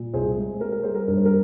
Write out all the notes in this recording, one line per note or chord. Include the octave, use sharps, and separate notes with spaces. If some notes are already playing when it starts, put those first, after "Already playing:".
Already playing: A#2
C2 G#4 C5
G#3
A#3 A#4
A#4
G3 G#4 C5
A#4
G2 A#4
C5
A#4